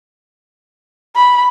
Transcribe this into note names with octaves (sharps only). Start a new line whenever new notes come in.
B5